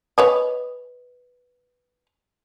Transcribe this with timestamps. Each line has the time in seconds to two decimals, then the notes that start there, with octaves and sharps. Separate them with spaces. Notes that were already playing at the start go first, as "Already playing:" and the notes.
0.18 B4 C#5 D#5